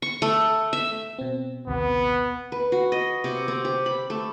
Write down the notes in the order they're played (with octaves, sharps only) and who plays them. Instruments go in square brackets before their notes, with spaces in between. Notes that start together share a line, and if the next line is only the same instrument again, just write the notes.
[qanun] C#6
A3
E5
[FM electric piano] B2 C4
[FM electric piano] A#1 D#2 C3 [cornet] B3
[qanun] B4
F#4
D#5
C3
C4
G4
B5
A3